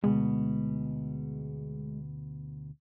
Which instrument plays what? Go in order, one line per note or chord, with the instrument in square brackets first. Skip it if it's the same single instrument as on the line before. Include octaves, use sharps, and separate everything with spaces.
[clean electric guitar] D2 B2 B3 [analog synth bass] G#3